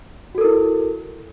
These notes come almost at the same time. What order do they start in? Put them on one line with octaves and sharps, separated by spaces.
F#4 A4 A#4 E4